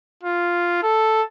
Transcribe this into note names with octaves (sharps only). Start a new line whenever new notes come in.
F4
A4